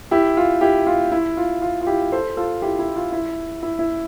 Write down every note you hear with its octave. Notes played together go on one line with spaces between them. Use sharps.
E4 G4
F4
E4 G4
F4
E4
F4
F4
F4
E4 G4
A4 C5
F4 A4
E4 G4
E4
F4
E4
E4
E4